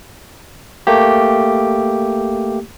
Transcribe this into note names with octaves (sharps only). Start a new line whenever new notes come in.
A3 A#3 G4